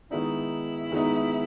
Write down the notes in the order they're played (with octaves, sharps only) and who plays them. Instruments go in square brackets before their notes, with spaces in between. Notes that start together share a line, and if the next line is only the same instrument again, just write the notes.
[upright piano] D#3 G#3 B3 D#4 [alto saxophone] E4
[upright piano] D#3 G#3 B3 D#4